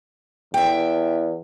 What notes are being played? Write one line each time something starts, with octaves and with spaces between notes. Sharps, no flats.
E2 E5 G5